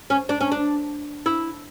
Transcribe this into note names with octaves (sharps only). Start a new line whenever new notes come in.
C#4
D4
C#4
D4
E4